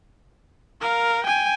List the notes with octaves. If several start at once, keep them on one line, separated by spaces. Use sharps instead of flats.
A#4 F5
G5 G#5